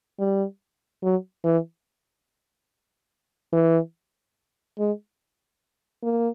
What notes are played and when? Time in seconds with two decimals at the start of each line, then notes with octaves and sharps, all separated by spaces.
0.19 G3
1.03 F#3
1.45 E3
3.53 E3
4.79 G#3
6.03 A#3